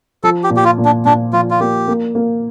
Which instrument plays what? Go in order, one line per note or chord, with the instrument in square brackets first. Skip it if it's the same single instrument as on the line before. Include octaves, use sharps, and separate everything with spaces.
[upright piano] F3 [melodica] A4
[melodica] G4
[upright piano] A#2
[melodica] G4
F4
[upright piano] A#2
[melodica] D4
[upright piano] A#2 [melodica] D4
[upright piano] F3 [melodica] F4
[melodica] F4
[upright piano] A#3 [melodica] G4
[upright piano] A#3
A#3